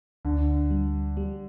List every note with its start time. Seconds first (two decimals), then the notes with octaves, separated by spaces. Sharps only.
0.25 D2 D3
0.71 G3
1.17 G3